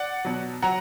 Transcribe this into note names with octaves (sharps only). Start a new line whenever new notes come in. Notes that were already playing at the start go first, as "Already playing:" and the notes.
Already playing: D5 F#5
B2 F#3
F#3 F#5 A#5